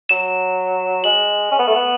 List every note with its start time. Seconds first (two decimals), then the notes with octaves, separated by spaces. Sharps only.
0.09 F#3 E7
1.04 G#3 F#7
1.51 C#4
1.59 B3
1.67 A3
1.75 B3